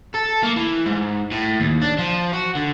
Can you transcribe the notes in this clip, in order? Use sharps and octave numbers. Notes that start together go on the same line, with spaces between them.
A4
A#3
E3
G#2
A2
D#2
D4
F3
F#4
D3